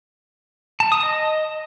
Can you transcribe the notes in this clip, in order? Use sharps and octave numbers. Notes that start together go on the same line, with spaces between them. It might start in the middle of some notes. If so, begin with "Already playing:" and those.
A5
D#6
D#5